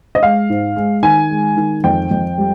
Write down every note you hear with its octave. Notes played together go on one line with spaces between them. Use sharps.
D#5
G#3 F5
G#2
G#3
D#3 G#5
G#3
D#3
F2 G5
F2
G3